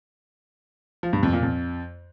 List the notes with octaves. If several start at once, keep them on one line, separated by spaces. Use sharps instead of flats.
F3
G2
F2
A#2
F2